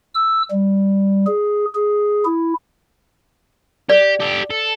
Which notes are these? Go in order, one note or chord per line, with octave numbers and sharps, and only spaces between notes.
E6
G3
G#4
G#4
E4
G4 D5
G4 A4
A4